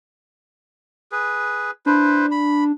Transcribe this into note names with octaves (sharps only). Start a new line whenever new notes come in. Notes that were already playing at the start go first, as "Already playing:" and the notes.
G#4 B4
D4 E4 B4 C5
B5